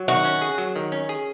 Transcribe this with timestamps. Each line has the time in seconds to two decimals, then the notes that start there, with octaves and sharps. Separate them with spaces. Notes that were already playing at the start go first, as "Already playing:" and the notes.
Already playing: F#3
0.08 D#3 F#4
0.25 C#4
0.42 G#4
0.58 F#3
0.76 D#3
0.92 C#4
1.09 G#4